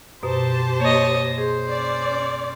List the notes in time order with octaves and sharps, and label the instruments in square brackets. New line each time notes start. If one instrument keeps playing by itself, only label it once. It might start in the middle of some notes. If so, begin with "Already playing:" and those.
[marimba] F#2 B2 [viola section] G4 C5 A5
[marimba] A#3 [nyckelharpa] C#5 D#5
[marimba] G#4 [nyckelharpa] C5
[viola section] C#4 D5